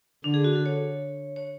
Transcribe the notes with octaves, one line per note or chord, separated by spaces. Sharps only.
D3 D4
G#4
F#4
A4
C#5
C#5